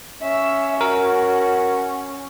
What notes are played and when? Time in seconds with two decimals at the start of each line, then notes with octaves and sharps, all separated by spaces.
0.22 C#4 E5
0.81 F#4 A#4